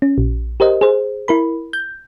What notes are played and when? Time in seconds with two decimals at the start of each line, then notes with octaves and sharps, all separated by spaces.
0.02 C#4
0.18 A#1
0.60 G4 A#4 C5 D#5
0.81 G#4 C5
1.28 E4 A#4 B5
1.73 G6